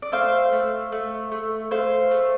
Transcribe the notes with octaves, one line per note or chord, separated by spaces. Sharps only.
D5
A3 C5 F5
A3
A3
A3
A3 C5 F5
A3